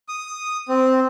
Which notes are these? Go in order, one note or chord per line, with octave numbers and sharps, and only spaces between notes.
D#6
C4